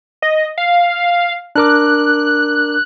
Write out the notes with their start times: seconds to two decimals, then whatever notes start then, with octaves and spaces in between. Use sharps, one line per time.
0.22 D#5
0.58 F5
1.55 D4 A#4 D6 F#6